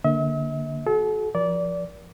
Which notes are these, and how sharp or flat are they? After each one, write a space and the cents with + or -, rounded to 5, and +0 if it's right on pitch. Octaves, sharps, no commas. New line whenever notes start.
D3 +0 A#3 +0 E5 -45
F#4 +10 A4 -40
F3 -15 A#4 +35 D5 -20